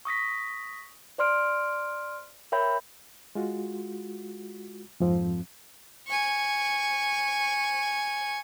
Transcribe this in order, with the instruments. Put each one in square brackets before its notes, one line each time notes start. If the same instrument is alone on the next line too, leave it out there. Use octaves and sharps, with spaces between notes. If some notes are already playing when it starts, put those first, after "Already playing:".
[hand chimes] C#6 D#6 A#6 B6
C5 D5 C6 F6 D7
A#4 C#5 E5 G5 B5 G6
[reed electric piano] G#3 F4 F#4
F2 G#2 F3 C4
[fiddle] G#5 C#6